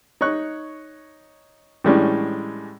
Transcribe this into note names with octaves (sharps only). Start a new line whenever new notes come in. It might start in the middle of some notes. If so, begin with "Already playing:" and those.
D#4 C#5 C#6 F#6
A2 E3 G3 G#3 C#4 D4